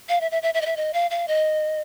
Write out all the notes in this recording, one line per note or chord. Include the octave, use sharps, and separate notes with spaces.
F5
E5
E5
E5
E5
D#5
E5
D#5
F5
F5
D#5